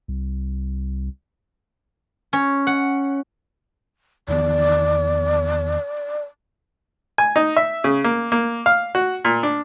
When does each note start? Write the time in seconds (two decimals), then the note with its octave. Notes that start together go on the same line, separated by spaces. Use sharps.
0.08 C2
2.33 C#4
2.67 F#5
4.28 E2 D#3 B3 D5
7.18 G#5
7.36 D#4
7.57 E5
7.84 C#3
8.04 A#3
8.32 A#3
8.66 F5
8.95 F#4
9.25 A#2
9.43 D4